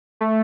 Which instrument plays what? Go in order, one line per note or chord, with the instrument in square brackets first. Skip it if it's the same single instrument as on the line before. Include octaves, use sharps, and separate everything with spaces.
[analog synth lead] A3